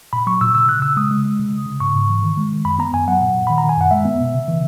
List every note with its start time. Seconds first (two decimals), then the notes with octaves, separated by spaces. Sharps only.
0.13 A#2 B5
0.27 F#3 C#6
0.41 A#2 E6
0.55 C#3 E6
0.68 C#3 F#6
0.82 C#3 E6
0.97 G#3 D#6
1.11 G#3
1.25 G#3
1.39 C#3
1.53 C#3
1.66 C#3
1.80 G#2 C#6
1.95 G#2
2.09 E3
2.22 D#3
2.37 G#3
2.52 D#3
2.65 F#2 B5
2.79 B3 A#5
2.93 F#2 G#5
3.07 F#3 F#5
3.21 A#2
3.35 A#2
3.47 D#3 B5
3.58 A#5
3.64 D#3
3.69 G#5
3.77 F#2 F#5
3.91 G#3 E5
4.05 B3
4.20 B2
4.34 C#3
4.48 E3